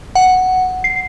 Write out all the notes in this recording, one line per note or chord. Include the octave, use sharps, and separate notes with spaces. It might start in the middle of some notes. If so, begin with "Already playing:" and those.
F#5
C7